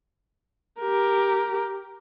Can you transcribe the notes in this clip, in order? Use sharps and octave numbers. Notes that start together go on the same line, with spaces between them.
G4 A#4